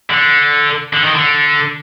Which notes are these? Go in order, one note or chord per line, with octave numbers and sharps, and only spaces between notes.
D3
D3
D#3
D3